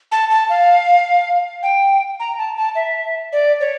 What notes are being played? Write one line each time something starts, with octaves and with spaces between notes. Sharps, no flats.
A5
A5
F5
G5
A#5
A5
A5
E5
D5
C#5